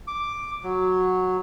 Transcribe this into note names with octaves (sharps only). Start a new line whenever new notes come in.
D6
F#3